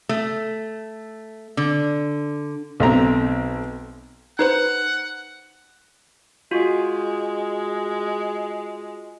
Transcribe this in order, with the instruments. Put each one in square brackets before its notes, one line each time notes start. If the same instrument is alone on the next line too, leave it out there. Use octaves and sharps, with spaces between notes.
[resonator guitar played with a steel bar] A3
D3
[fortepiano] B1 A3 C4 A#5
[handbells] D#4 B4 C5 [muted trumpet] F#5
[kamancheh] G#3 [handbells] F4 F#4